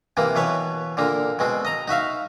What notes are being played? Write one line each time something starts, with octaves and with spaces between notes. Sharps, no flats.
C3 E3 A#3
B2 E3 B4 C#5
A#2 D3 A#3
B2 G#3 C4
D#5 A#5
D#4 F#4 E5 F5